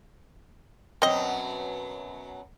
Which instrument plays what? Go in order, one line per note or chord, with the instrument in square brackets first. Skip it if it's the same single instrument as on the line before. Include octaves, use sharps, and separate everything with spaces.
[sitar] F#2 B2 F#3 [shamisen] C4 D#5